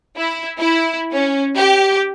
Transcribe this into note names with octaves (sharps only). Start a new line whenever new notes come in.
E4
E4
C#4
G4